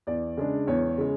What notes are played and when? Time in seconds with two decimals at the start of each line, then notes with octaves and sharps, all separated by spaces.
0.07 E2 D5
0.37 C#3 G#3 D4
0.67 E2 C#5
0.98 C#3 G#3